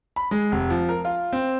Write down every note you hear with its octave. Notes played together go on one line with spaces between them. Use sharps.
B5
G#3
F1
F3
A#4
F4
C4